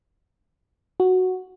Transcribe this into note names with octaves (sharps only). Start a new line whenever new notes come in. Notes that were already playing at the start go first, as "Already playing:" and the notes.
F#4